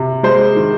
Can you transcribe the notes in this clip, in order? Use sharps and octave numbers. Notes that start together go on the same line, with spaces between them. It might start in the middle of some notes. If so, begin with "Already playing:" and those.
Already playing: C3
G#3 C5
D#3